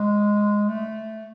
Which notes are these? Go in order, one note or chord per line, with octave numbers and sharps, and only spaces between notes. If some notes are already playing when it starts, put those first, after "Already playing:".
Already playing: G#3
A3